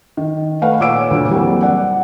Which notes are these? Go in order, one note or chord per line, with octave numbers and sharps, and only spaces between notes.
D#3
A3 B4 F5 F#5
A#2 C#5 D6 E6 D7
D2 G2 A#2
E3 F#3 G3 A#3 C4
D5 F#5